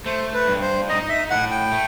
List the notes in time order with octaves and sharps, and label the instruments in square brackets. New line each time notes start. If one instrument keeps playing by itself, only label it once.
[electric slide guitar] A3 [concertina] C5
[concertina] B4
[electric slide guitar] G2
[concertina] C5
[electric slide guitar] D#4 [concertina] D#5
[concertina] D#5
E5
[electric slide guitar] A2 [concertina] F#5
[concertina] G5
[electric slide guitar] A3